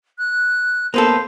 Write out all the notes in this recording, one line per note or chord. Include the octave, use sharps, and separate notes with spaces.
F#6
A#3 B3 A4 C5